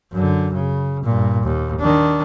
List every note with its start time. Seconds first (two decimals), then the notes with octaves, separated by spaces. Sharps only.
0.13 F#2 D3
0.53 C#3
1.04 G2 A#2
1.43 D#2
1.79 D#3 D4